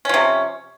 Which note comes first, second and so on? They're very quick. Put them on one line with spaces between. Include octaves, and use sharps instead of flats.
C#4 F3 C3